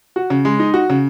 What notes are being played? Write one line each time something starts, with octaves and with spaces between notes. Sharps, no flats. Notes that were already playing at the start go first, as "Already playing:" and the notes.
F#4
C#3
G#3
D#4
F#4
C#3